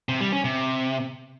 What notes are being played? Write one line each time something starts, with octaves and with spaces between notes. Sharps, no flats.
C3
G3
C#4
C3